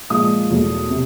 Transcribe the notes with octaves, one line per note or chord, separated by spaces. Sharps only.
A#2 F3 G#3 D#6
E2 B2 F#3 A3
C3